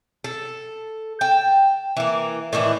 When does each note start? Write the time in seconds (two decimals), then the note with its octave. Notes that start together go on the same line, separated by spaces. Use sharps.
0.24 A4
1.21 G5 A5
1.97 E3 A#3
2.53 A2 D#3 E3 D4